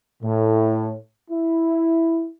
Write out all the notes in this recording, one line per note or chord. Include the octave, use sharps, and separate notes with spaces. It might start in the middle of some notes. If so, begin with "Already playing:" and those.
A2
E4